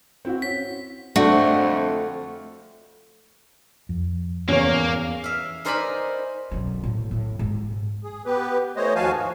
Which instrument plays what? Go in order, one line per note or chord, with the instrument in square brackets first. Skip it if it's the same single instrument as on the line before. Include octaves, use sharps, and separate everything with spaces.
[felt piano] C4 E4 F#4
[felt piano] C#4 [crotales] B6
[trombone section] F2 D3 [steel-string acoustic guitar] A3 [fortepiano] C4 D4 [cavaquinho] F#4
[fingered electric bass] F2
[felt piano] E2 [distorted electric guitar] A#3 [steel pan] C#4 C#5
[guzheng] E5 F5
D#4 A#4 C5 D5 G#5 B5
[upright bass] B1 F#2
A2
A2
G#2 G#3
[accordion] G#4
B3 G4 B4
E3 A3 C5 C#5 D#5
D#2 F3 F#4 F5 G#5 A5
G#2 F#4